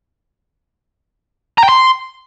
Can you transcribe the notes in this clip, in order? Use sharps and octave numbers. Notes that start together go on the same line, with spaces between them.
A#5
G5
C6